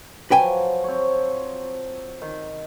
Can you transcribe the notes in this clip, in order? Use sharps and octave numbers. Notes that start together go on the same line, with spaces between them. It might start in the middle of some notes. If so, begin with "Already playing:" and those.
F3 F#3 B4 G5 G#5
C4 C#5
D#3